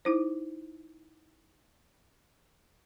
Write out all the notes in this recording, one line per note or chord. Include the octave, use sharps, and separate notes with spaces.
D#4 E4 C5